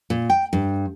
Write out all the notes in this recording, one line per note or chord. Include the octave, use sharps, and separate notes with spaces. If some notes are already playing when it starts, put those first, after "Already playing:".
A#2
G5
G2